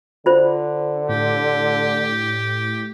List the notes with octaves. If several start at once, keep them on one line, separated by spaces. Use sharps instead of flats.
D3 F4 C5
A2 G4